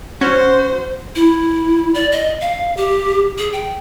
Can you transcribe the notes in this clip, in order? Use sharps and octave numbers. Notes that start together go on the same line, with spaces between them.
C#4 F#4 C5
E4
D5
D#5
F5
G4
G#4
G5